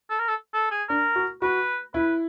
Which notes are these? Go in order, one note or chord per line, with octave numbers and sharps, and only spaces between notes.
A4
A#4
A4
A4
G#4
D4 A#4
F#4
F#4 B4
E4 B4